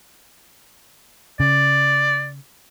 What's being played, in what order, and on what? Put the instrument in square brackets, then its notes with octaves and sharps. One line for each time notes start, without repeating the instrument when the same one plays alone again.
[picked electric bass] C#3 [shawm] D5